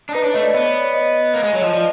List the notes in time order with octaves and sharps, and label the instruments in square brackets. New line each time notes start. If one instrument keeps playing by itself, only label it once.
[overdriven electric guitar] D4
[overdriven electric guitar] D#4 [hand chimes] B4
[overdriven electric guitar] D4 [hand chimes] C#5
[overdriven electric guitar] A3 [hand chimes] D#5
[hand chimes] D5
[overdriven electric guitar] B3 [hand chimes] C#5
[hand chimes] D5
C#5
D#5
[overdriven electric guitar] A#3
G#3
F#3
[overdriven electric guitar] F3 [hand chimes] D#5
[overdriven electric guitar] F3 [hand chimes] D5